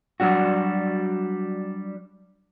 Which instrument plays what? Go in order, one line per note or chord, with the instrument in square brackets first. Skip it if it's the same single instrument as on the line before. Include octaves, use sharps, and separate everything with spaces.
[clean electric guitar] F#3 G3 D4 F#4